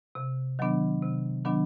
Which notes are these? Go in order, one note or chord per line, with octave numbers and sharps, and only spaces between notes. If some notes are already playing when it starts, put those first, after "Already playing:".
C3
D#3 F#3 B3 D4
C3
D#3 F#3 B3 D4